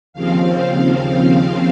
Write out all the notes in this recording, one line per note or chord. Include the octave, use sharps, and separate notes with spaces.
D#2 C#3 F3 C4 F5